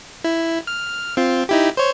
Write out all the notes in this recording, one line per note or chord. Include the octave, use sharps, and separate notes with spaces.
E4
F6
C4 F4
D#4 E4 G4
C5 C#5